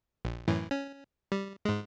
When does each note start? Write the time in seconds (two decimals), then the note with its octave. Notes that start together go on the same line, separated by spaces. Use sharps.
0.25 A#1
0.48 F#2 A2 E3
0.71 C#4
1.32 G3
1.65 G#2 G#3